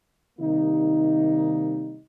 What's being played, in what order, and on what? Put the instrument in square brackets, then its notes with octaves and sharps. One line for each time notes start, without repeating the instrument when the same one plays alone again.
[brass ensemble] C3 D#3 G3 A#3 D#4